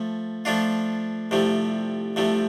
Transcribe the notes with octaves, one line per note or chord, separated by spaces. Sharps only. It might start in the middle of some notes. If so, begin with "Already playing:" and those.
Already playing: F3 A3
F3 A3 D4 F4
C2 C3 F3 A3
C2 C3 F3 A3